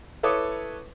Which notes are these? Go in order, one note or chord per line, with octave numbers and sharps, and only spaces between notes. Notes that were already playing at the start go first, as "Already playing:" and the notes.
E4 A4 B4 C#5 D6 D#6